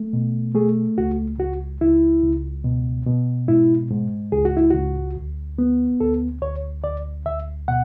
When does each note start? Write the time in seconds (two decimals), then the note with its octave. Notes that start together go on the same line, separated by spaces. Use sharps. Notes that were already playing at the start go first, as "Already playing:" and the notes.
Already playing: A3
0.13 B2
0.55 A3 G#4
0.98 C#2 F#4
1.39 C#2 F#4
1.81 C#2 E4
2.23 C#2
2.64 B2
3.06 B2
3.48 G#2 E4
3.91 G#2
4.32 C#2 G#4
4.45 F#4
4.57 E4
4.70 C#2 F#4
5.17 D2
5.58 B3
6.00 D2 A4
6.41 D2 C#5
6.84 D2 D5
7.26 D2 E5
7.68 B2 F#5